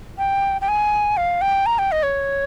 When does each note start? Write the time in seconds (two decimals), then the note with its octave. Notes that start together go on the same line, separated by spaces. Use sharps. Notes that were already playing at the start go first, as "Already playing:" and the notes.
0.18 G5
0.61 G5
0.68 G#5
1.17 F5
1.41 G5
1.66 A#5
1.79 G5
1.92 D#5
2.03 C#5